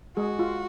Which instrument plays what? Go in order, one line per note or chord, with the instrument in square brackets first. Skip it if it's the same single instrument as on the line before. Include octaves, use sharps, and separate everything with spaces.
[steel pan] G#3 G#4 [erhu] F#4
[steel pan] F4